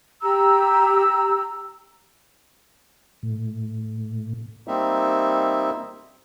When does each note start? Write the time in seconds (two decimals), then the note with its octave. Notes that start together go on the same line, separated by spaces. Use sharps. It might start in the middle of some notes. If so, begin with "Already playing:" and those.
0.22 G4 A#5 E6
3.23 A2
4.68 G3 A#3 C4 D#4 E5